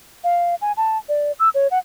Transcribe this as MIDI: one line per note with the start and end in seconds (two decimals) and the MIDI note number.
0.24 0.55 77
0.62 0.72 80
0.77 0.98 81
1.09 1.32 74
1.39 1.49 88
1.54 1.68 73
1.71 1.79 78